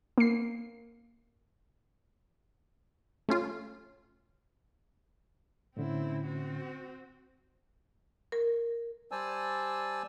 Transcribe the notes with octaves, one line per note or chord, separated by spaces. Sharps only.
A#3 C7
A3 C#4 F4
A2 D3 C4 C#4 E4
C4 F#4
A#4
G3 C5 D5 G#5 A5 E6